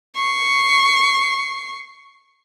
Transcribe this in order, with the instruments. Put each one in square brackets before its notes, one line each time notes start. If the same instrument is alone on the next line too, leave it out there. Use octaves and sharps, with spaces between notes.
[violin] C#6 C7